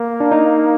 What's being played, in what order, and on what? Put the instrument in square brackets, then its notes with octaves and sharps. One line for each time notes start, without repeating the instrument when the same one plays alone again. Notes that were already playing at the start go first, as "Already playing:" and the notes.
Already playing: [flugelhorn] A#3
[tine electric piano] D4
D#4